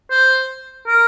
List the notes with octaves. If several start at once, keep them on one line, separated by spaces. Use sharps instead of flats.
C5
A#4